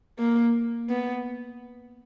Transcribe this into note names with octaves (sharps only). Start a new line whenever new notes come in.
A#3
B3